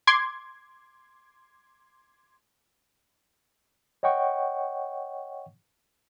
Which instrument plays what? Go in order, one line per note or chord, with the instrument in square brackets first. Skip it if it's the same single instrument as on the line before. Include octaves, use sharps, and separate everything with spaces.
[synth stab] C6 D6 G#6
[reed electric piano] C#5 D#5 F#5 G5 C#6